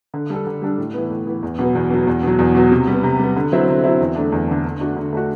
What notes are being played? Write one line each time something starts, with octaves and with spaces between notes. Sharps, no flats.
D3
G3 D4 A4
D3
G3 D4 A4
A2
E3 B3
A2
E3 B3
E2
B2 F#3 B3
E2
B2 F#3 B3
E2
B2 F#3
E2
B2 F#3
C3
G3 B3
C3
G3 B3
D3
F#3 C4 E4
D3
F#3 C4 E4
E2
D3 A3 D4
E2
D3 A3 D4
D3
A3 D4 F#4
D3
A3 D4 F#4